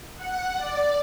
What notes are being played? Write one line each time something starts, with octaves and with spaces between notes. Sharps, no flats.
F#5
D5